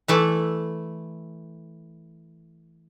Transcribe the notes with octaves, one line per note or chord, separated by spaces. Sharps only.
E3 A3 D5